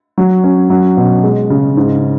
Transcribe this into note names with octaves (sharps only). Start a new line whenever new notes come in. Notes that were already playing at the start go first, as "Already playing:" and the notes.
F#3
C#4
F#3
B2
G#3
C#3
G#2